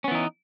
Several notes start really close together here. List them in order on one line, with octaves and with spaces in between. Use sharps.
C#4 B3 E3 D#4